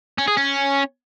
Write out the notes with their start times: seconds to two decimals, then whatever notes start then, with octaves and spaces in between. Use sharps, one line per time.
0.18 C#4
0.28 G#4
0.37 C#4